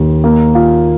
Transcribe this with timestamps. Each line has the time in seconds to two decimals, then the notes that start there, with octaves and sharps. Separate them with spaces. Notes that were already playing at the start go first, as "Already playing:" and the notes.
Already playing: D#2
0.24 A#3
0.55 F4